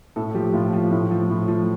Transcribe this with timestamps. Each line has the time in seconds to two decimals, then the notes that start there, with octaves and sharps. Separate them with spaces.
0.16 A2 A4
0.34 F3 G4
0.53 A2 F4
0.73 F3
0.92 A2
1.11 F3
1.30 A2
1.48 F3